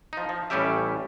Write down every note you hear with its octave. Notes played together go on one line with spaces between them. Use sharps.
F3 D#4
F3
A1 A2 G3 C#4 G4 E5